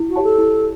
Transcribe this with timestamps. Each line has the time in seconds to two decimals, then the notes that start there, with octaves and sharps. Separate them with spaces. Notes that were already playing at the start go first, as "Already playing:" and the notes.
Already playing: E4
0.09 F#4
0.16 G4 C#5 E5 A5
0.23 A4
0.38 E4